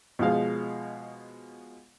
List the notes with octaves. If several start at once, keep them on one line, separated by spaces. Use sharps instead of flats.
B2 F3 G#3 F5